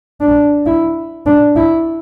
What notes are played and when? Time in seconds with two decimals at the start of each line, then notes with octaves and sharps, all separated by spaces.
0.21 D4
0.66 E4
1.26 D4
1.56 E4